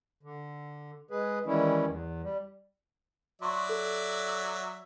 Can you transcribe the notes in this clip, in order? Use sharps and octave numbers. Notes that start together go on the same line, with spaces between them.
D3
G#3 G#4 B4
D#3 E3 G3 G#3 C#4 E4
E2
G3
F#3 D5 E5 C6 C#6
A4